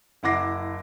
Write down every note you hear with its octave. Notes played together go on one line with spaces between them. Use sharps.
F#1 E4 F#5 D6 A#6 C7